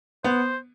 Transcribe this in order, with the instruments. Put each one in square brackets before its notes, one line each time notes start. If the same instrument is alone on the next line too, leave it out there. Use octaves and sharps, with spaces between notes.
[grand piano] B3 [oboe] C5